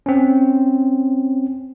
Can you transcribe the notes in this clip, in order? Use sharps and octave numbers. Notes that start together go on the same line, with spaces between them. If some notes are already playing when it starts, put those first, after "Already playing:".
C4 C#4